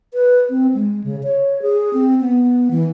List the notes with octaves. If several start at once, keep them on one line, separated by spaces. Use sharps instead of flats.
B4
C4
G#3
C#3
C#5
G#4
C4
B3
E3